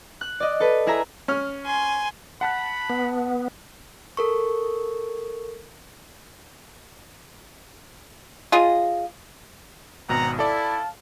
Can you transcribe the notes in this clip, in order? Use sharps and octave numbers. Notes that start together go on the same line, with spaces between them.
F#6
D5 D#5
A4 B4
E4 G#4 E5 A#5
C#4 F6
G#5 C6
F#5 A5 B5 F#6
B3
A4 A#4 C#6
F4 G#4 D#5
G#1 B2 C4 F#5 A#5
E4 A4 D5 F5 A5